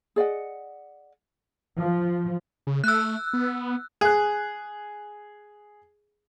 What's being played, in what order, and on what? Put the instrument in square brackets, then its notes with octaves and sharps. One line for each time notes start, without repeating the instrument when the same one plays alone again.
[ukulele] G#4 D5 D#5 F#5
[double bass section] F3
[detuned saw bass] C#3
[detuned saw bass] A3 [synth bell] E6 F#6
[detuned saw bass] B3
[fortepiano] G#4 F#6